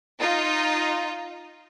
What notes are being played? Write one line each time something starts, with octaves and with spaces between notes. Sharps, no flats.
D#4 F4